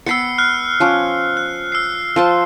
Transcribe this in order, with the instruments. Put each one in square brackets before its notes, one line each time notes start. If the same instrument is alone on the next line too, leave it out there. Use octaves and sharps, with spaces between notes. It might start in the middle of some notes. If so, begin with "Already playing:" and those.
[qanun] B3 G5 B5 [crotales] E6 C7 C#7
[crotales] F6 F#6
[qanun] F3 C#4 D6
[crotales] F#6
E6 C7
[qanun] F3 C5 A5